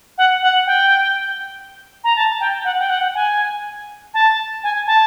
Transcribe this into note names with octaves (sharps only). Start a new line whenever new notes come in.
F#5
F#5
G5
A#5
A5
G5
F#5
G5
F#5
G#5
A5
G#5
A5